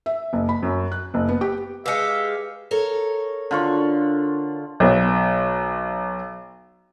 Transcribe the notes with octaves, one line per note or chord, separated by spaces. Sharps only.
E5
F#1
B5
F#2
F#6
F#1
B3
G4
G#3 G4 B4 E5 F5 C#7
A4 A#4 C#5
D3 F4 C#6
B1 B3